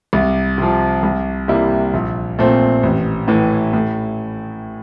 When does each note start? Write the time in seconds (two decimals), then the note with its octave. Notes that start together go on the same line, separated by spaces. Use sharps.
0.13 C2
0.58 C3 F3
1.03 C2
1.48 C3 G3 A#3 E4
1.94 A#1
2.39 A#2 A3 C4
2.83 A1
3.28 A2 E3
3.73 A2